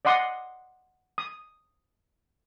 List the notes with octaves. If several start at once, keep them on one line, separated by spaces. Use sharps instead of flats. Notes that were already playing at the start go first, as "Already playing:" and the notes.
D5 D#5 F#5 C6 D#6
D#6